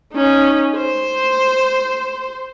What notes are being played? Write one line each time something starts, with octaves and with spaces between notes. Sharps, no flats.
C#4 D#4
C5